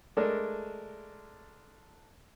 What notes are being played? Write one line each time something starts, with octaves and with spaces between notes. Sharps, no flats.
G#3 A3 D4 A4 A#4